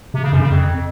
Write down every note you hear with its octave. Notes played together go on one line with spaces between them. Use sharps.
C3
C#3
F#2
C#3
F2